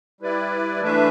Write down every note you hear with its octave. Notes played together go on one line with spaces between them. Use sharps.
G3 E4 B4 D5
E3 A3 D4 B4 E5